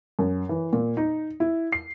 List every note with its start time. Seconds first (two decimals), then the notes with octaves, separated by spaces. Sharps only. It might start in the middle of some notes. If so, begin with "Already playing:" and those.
0.19 F#2
0.49 E3
0.73 A#2
0.97 D#4
1.40 E4
1.72 C7